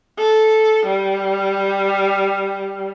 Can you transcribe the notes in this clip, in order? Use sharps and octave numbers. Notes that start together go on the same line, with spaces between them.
A4
G3